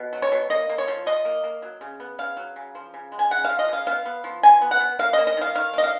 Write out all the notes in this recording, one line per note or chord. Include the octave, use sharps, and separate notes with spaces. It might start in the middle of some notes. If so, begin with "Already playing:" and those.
Already playing: B2
F#3
C#5
B2
A#3 D#5
A#3
C#5
F3
F3 D#5
A#3
A#3
F#3
C#3
B3
C#3 F5
F#3
C#3
F3
C#3
G#3
G#5
C#3 F#5
F3 F5
D#5
C#3 F5
B3 F5
B3
F3
F3 G#5
B3
F#5
B3
A#3 F5
A#3 D#5
D#5
D#3 F5
D#3 F5
A#3 D#5
F5